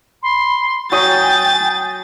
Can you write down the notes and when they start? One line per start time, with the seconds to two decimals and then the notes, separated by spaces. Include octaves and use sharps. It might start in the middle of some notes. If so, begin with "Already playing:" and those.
0.23 B5 C6
0.92 F#3 G5 G#5 D#6 G6 A6